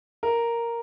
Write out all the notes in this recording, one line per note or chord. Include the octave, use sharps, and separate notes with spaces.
A#4